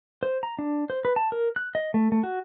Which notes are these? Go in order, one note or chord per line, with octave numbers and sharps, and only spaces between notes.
C5
A#5
D4
C5
B4
A5
A#4
F#6
D#5
A3
A3
F#4